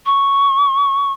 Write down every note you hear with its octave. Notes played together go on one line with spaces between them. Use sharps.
C#6